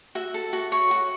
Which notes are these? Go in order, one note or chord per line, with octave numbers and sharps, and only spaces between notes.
F#4 E5
A4
F#4
C#5
F#4